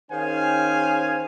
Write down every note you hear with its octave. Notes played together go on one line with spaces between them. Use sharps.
D#3 C#4 G#4 C5 F5 G#5